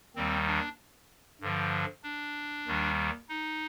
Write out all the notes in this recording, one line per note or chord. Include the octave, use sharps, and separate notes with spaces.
D#2 D#3 G3 C4
D4
G2 D3 F3
D4
D#2 D#3 G3
D#4